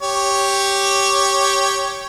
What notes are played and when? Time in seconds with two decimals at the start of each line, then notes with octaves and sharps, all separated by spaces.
0.02 G4 C#5